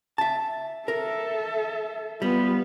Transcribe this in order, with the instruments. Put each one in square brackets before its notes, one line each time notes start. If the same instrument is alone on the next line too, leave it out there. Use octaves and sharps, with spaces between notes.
[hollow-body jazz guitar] E5 A5
[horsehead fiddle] A4 E5 [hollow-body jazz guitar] A#4
[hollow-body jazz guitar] G3 [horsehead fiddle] B3 F4